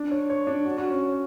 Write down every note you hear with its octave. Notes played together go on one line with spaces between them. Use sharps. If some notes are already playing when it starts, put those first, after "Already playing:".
Already playing: D4
C#5
C#5
D4
F#4
F#4
C#4